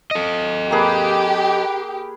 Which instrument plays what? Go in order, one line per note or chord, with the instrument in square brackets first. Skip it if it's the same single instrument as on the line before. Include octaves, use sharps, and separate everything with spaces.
[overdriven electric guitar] A4 D#5
[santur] A#3 G#4 B4 [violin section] G4